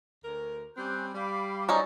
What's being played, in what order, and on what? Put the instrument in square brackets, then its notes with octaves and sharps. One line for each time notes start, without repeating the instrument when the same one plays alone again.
[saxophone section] D2 A#4
[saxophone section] G3 C4 [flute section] C#4 F#6 G6
[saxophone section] G3 [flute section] F5 B5 D6
[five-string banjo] F#3 C#4 D#4 [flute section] C5 D5